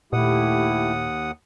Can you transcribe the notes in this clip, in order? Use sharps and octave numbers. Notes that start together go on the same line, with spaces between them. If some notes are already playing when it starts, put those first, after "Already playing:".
D#2 A#2 A3 E4 G4 F#5 D#6